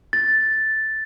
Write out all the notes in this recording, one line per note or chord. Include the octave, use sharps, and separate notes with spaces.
A6